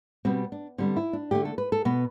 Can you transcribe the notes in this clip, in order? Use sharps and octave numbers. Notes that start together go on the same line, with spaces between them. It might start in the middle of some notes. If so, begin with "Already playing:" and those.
B2 G3 B3 C4
D4
D3 G3 B3 C4
E4
D4
D3 A3 G4
A4
B4
A4
B2 B3 B4